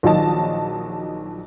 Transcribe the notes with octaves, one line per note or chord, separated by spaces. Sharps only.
A#1 D#3 F#3 D#5 A5